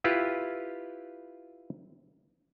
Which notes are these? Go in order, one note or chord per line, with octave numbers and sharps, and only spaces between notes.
E4 F4 G4 B4